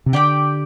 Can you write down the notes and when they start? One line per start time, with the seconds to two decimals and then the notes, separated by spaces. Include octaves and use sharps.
0.06 C3
0.13 D3 G4 D5 G5